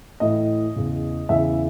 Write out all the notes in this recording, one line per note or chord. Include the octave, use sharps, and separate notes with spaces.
A2 E3 D#5
E2 C#3 E3
E2 C#3 E3 E5